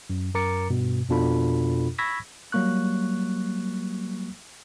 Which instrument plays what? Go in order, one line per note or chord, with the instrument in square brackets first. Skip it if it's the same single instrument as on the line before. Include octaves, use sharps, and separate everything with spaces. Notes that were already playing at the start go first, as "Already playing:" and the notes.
[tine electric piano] F#2
F#2 A#4 A#5 D6 A6 C#7
G2 B2
F2 B2 D4 F4 A4 B5
B5 C#6 E6 G#6 A#6 B6
F#3 G3 A#3 C#6 F#6